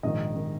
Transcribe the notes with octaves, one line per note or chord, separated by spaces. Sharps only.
A#1 G#2 D#3 D#5
D#3